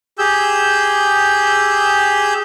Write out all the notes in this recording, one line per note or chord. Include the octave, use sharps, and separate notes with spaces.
G4 G#4 E6 G6